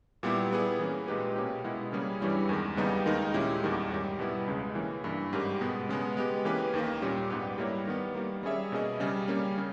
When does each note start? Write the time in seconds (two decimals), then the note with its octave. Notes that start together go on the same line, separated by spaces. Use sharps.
0.23 A#2 G3 B3 E4 G4
0.50 G3 B3 E4 G#4
0.79 E3 A#3 C#4
1.08 A#2 G#3 D#4 G4 B4
1.36 B2 A#3 C#4 G4
1.64 B2 G#3 B3 E4
1.92 C#3 G3 A#3 C#4 G#4
2.21 G2 E3 G3 C#4 E4
2.49 E2 D#3 G#3
2.77 D#2 C#3 G3 B3 D#4
3.06 D#2 D#3 G#3 D#4 A#4
3.34 A#2 G#3 C#4 E4 G4
3.63 E2 D#3 G3 A#3
3.90 G#2 G3 C#4 G4
4.19 B2 G3 B3 E4
4.48 C#2 C#3 G#3
4.75 E3 A#3 C#4
5.04 G2 E3 A#3
5.33 G#2 G3 C#4 G4 A#4
5.61 B2 G#3 B3
5.89 C#3 G#3 B3
6.17 G#3 B3 G4
6.45 E3 A#3 C#4 G4 B4
6.74 D#2 D#3 A#3
7.02 A#2 G3 C#4 G4
7.30 G#2 G3 B3 G4 B4
7.58 G3 A#3 E4 A#4 C#5
7.87 D#3 G3 B3
8.15 D#3 G3 A#3
8.43 G3 C#4 G#4 C#5 E5
8.72 B2 A#3 C#4 G#4 D#5
9.00 C#3 G3 C#4
9.28 G3 A#3 C#4
9.58 C#3